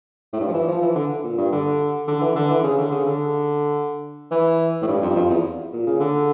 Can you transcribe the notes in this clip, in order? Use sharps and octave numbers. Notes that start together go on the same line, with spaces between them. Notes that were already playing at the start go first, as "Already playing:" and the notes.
A2
G2
F3
E3
F3
E3
D3
A#2
G2
D3
D3
E3
D3
E3
C#3
D3
C#3
D3
E3
A2
G2
F2
G2
F2
E2
A#2
C#3
D3